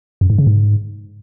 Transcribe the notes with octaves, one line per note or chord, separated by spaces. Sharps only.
F#2
G#2
C#3
G#2